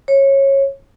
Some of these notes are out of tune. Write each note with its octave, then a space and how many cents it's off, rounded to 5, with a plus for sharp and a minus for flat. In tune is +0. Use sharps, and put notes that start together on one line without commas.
C#5 -20